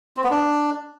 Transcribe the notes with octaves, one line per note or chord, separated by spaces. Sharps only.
C4
B3
D4